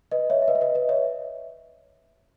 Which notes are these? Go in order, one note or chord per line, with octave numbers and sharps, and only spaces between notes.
B4 D#5
C#5 E5
E5
B4 D#5
E5
B4 D#5
B4 D#5
C#5 E5